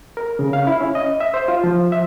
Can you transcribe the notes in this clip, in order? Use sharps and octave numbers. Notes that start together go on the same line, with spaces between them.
A#4
C#3
F5
E4
C#4
D#5
E5
C5
F4
F3
E5